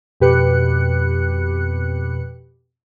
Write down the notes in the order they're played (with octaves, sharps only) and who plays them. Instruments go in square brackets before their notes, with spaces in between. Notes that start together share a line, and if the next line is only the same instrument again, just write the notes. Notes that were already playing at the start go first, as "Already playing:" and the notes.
[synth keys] F2 B2 G4 B4 F#6 C#7